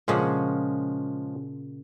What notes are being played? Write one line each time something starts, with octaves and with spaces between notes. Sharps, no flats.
A#2 C#3 F3 G#3 C#4 F#5